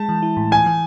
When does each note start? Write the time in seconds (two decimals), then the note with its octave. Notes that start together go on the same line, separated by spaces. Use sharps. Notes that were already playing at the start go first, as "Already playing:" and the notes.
Already playing: G#3 A5
0.09 E3
0.22 E4
0.37 A2
0.51 E3 G#5
0.66 E3